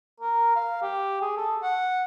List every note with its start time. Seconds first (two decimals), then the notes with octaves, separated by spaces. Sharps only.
0.20 A#4
0.55 F5
0.82 G4
1.22 G#4
1.37 A4
1.62 F#5